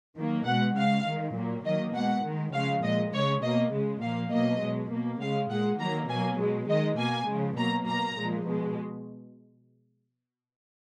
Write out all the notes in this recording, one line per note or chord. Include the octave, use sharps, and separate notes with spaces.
D#3 F#3 A#3
B2 G#3 F#5
C#3 G#3 F5
D#3 G#3
A#2 F#3 A#3
D#3 F#3 A#3 D#5
B2 G#3 F#5
D#3 G#3
C#3 F3 G#3 F5
A#2 G#3 D#5
C#3 G#3 C#5
B2 A#3 D#5
C#3 G#3
A#2 F3 A#3 F5
B2 F#3 A#3 D#5
B2 G#3
B2 A#3
C#3 G#3 F5
A#2 G#3 F#5
D#3 F#3 A#3 A#5
B2 F#3 A#3 G#5
B2 G#3
D#3 G#3 D#5
B2 A#3 G#5
C#3 F3 G#3
B2 F#3 A#3 A#5
B2 A#3 A#5
A#2 F3 G#3
B2 G#3